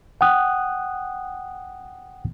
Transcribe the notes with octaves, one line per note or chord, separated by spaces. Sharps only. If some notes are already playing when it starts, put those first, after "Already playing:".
F#5 G5 D#6 F#6